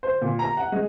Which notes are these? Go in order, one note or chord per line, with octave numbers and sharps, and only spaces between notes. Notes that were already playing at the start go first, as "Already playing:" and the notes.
C5
A#2
A#5
F#5
G#3